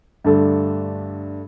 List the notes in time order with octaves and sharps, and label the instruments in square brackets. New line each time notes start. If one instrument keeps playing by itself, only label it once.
[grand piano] G2 D3 A3 D4 A4